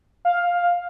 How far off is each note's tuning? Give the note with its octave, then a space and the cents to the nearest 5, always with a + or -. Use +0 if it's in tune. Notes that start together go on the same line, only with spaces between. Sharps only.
F5 +10